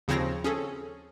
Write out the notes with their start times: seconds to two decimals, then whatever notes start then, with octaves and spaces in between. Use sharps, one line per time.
0.08 D#2 C#3 F3 C4 C#5 A#6
0.44 C#4 G#4 A4